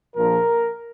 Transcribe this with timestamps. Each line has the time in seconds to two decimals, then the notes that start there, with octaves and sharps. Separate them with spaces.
0.15 A#1 A#2 F3 A#4